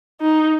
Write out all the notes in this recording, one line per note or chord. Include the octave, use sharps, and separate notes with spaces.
D#4